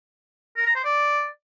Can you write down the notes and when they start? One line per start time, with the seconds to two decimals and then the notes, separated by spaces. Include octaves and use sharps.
0.57 A#4
0.66 A#5
0.75 C5
0.84 D5